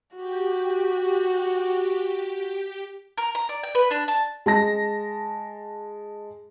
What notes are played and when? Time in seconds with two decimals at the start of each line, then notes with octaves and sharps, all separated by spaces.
0.16 F#4 G4
3.18 A#4
3.35 A#5
3.49 D5
3.63 G5
3.75 B4
3.91 D4
4.08 A5
4.46 G#3 A5 A#6